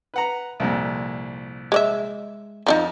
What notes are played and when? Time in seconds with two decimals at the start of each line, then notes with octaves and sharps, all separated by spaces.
0.14 B4 F#5 A#5
0.60 C2 F2 A#2
1.72 G#3 D5 E5
2.66 F2 F3 D4 D#4 A#5